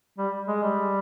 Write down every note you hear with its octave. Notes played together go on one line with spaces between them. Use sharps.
G3
G#3
G3